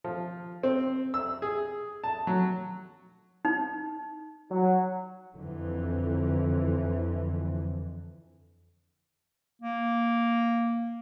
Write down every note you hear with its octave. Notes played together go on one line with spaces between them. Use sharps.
F3
C4
E6
G#4
A5
F#3
D#4
F#3
F2 D3 E3
A#3